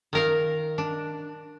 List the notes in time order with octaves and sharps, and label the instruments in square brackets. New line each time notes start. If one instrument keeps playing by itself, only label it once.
[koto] D#3 A#4 F5
D4